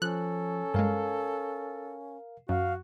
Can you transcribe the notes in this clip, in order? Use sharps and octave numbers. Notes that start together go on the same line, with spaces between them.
F3 C#4 A4 F#6
G2 G#3 A#4 F5
F#2 F#4 F5